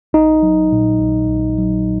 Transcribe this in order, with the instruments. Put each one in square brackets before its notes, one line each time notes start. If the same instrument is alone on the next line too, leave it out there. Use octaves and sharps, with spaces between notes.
[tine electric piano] A#1 D#4
F#3
A#2
A#1
A#1
F#3